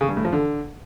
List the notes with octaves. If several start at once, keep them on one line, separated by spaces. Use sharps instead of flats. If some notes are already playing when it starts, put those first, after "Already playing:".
C#3
G2
A2
F3
D3